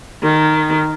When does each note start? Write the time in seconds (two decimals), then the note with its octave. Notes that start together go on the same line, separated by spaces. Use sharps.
0.22 D#3